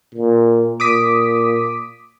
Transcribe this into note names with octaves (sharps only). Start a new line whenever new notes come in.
A#2
A#2 D6 D#6 B6